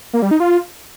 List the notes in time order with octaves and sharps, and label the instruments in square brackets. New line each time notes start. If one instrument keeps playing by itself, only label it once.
[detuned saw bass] A#3
G3
D#4
F4